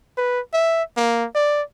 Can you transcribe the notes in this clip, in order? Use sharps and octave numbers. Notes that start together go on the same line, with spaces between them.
B4
E5
A#3
D5